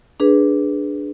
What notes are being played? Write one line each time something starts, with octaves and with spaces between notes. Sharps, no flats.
D4 G#4 B4